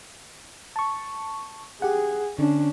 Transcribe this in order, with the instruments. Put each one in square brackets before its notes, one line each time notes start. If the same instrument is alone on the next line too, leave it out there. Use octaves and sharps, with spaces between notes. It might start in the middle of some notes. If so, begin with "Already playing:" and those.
[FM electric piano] A5 C#6
[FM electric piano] G4 F#5 [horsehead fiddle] G#4
[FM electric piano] D3 [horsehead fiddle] C#4 D4